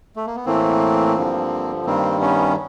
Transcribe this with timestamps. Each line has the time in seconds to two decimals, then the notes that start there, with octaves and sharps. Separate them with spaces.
0.16 A3
0.26 A#3
0.36 B3
0.45 A2 E3 A3 A#3 C4
1.16 G2 D3 F3
1.86 G2 D#3 G3 A#3 C4
2.20 B3 C#4